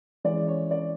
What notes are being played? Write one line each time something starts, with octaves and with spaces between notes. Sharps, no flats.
E3 G#3 C#4 D5
C#5
D5